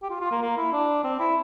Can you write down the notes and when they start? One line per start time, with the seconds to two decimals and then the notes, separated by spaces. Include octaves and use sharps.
0.02 G4
0.10 F4
0.21 F4
0.31 A#3
0.42 A#3
0.57 E4
0.73 D4
1.04 C4
1.20 E4